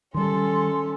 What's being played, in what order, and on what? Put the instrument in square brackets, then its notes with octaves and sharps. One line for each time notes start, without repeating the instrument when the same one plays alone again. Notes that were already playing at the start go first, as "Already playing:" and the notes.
[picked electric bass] D#3 G3 [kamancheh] C#4 A4 [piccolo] C6